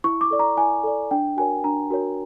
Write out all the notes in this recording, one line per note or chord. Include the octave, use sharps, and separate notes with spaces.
E4 C#6
D6
A4 D5
A#5
E4 G#5
A4 D5
D4 G5
F#4 A#4 C#5 G#5
D4 A#5
F#4 A#4 C#5